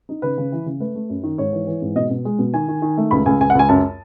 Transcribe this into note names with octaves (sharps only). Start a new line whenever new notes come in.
D#4
C#3 B4
C#3
E3
C#3
A3 B4
A3
F#2
D#3
G#2 C#5
E3
E3
G#2
B2 D#5
B2
G#3
B2
D#3 G#5
D#3
D#3
A3
C#2 B5
C#2 G#5
C#2 G#5
F#5
C#2 G#5
F#2 A5